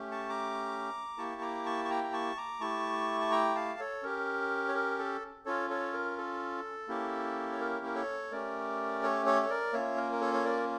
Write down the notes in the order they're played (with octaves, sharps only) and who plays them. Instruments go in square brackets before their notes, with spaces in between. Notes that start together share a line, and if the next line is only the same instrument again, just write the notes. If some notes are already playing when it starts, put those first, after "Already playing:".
Already playing: [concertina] A3 C#4 G4
A5 C#6
A#5 D6
A#3 E4 G4 A5 C#6
A#5 D6
A5 C#6
C#6
G5 A#5
A#5
A5 C#6
A#5 D6
A3 E4 G4 A5 C#6
A5
G5 A#5
F5 A5
A4 C#5
C#4 G4 A#4
C#5
A#4
A4
C#4 F4 A4 C#5
A4 C#5
A#4
A4
A#3 C#4 E4 G4
C#5
A#4
A#4
A4 C#5
A3 C#4 G4 A#4 D5
A4 C#5
A4 C#5
C#5
A#4 D5
A#3 C#4 F4 C#5 E5
A#4
A#4
A4 C#5
C#5
A#4 D5